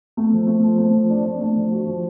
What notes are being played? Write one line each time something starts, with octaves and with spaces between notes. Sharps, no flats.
A3
F3
A3
F3
A3
F3
D4
D4
A3
F3
F#4
F3